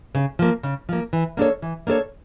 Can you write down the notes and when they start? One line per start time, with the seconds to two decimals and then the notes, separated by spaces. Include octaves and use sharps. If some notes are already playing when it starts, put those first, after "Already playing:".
0.15 C#3
0.39 F3 A#3
0.63 C#3
0.89 F3 A#3
1.13 E3
1.37 A#3 D4 A4 C#5
1.62 E3
1.87 A#3 D4 A4 C#5